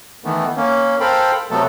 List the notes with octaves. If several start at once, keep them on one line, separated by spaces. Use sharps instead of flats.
D#3 E3 A3 B3
A#3 C#4
A4 A#4 C5 F5 G5 B5
C3 F#3 A3 B3 A4